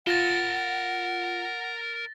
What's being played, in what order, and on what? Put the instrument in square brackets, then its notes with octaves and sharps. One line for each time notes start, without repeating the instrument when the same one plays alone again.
[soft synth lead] F4 [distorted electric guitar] A#4 A5 [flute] F#5 [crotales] A6 A#6 G7